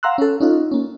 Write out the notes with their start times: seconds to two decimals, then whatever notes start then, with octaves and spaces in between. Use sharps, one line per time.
0.03 F5 F#5 A#5 C6 E6 F#6
0.18 C#4 A4
0.40 C#4 D#4 F4
0.71 A#3 C#4